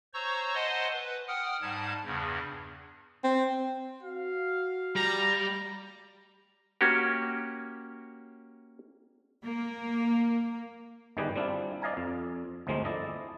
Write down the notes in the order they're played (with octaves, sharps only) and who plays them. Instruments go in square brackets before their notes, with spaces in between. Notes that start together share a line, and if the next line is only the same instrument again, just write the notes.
[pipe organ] C5 C#5 A#5 C#6 E6
C5 D#5 F#5 G#5 A5 C6
B4
F#5 G5 D#6 F6
G#2 G3 A5 G#6
E2 G2 C#3
[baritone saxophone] C4
[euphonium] F#4 [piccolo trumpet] F5
[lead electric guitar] G3 [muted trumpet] A#5
[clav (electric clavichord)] A#3 C#4 F#4 G4
[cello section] A#3
[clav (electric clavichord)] G1 D#3 G3 G4 G#4 B4
G3 C4 D4 E4 F4
D5 D#5 F5 G#5 A#5
F2
G1 D2 F3 G#3 A#3 C4
E4 A4 D5 D#5